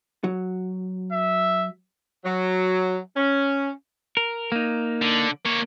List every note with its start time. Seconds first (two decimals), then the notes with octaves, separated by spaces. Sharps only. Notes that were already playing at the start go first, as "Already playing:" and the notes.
0.24 F#3
1.12 E5
2.25 F#3
3.17 C#4
4.17 A#4
4.52 A#3 D#4
5.01 D3
5.45 A#3 C#5